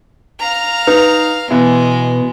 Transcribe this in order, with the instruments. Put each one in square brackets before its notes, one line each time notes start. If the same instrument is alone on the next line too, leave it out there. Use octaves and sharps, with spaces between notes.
[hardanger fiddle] F5 A#5
[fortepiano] D#4 [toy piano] B4
[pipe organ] B2 [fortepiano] E3 B3 E4 [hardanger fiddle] G#3